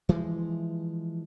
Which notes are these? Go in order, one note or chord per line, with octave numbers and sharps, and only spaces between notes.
E3 F3 G#3